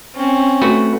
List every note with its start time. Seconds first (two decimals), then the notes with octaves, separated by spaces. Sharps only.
0.15 C4 C#4
0.62 A3 F#4 B4